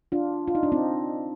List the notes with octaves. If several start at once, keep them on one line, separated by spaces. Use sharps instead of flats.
D4 F4
F4
D#4
D4
C4 D#4